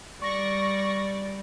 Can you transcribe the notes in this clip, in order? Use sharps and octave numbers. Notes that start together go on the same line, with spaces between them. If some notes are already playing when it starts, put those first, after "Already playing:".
G3 D5 C#6 A#6